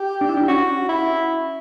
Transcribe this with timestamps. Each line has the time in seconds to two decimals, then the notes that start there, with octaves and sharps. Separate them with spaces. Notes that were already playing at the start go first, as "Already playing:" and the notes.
Already playing: G4
0.21 D4
0.29 E4
0.37 D4
0.48 C#4 F#4
0.89 E4